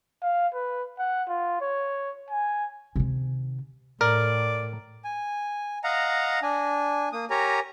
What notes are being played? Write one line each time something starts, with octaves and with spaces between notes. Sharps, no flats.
F5
B4
F#5
F4
C#5
G#5
C3 D#3
A2 A#4 D5
G#5
D#5 F5 F#5 A#5
D4 G#5
A#3 D#6
G4 A#4 C#5 G#5 A#5